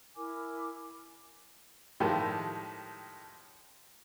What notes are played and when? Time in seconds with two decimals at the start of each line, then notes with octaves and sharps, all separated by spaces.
0.16 E4 A#4 G#5 D6
2.00 A2 D#3 F3 G#3 G4